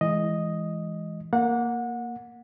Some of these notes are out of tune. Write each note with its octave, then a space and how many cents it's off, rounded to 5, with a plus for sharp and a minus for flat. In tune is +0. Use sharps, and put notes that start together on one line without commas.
E3 +0 G#3 +0 D#5 +0
A#3 +0 F#5 -25